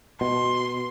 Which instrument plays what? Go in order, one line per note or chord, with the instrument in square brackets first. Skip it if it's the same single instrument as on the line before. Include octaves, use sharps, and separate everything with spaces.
[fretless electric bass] B2 [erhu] C6